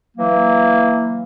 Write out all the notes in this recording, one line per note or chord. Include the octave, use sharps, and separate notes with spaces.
E3 F#3 A#3